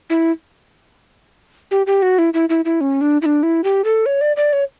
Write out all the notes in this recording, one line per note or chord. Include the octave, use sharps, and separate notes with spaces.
E4
G4
G4
F#4
E4
E4
E4
E4
C#4
D4
E4
D4
E4
G4
A4
C#5
D5
D5
C#5